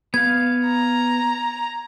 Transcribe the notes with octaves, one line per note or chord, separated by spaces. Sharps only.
B3 F5 G#6
A#5